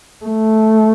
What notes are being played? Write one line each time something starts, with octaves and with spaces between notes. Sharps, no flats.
A3